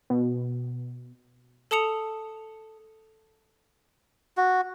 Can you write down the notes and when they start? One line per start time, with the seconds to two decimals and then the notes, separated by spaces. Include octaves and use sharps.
0.10 B2
1.71 A4 A5 D#6 C#7 F7
4.37 F#4